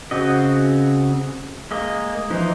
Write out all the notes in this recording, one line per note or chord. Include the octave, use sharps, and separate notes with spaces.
C#3 C4 F#4 D#5
G#3 A#3 D#5
E3 F3 D#4